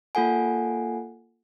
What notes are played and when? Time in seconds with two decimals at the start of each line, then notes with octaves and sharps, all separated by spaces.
0.15 A#3 F4 A4 F#5 G#5